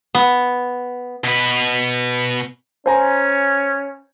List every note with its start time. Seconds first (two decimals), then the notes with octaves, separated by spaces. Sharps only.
0.15 B3
1.24 B2 B4
2.86 C#4 C5 G#5 A#5